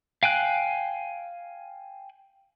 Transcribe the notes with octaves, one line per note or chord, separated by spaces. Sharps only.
F5 G5 G#5 F#6